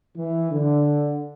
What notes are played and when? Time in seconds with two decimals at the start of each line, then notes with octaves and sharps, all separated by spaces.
0.16 E3
0.50 D3